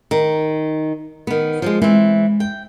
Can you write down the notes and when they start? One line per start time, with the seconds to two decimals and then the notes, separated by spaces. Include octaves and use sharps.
0.11 D#3
1.27 D#3 B3
1.62 F3 G3 G#3
1.82 E3 G#3 C4
2.40 G5